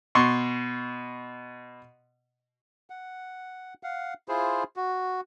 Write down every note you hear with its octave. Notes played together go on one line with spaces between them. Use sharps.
B2 C6 C#6
F#5
F5 F#5
E4 F4 G#4 C5
F#4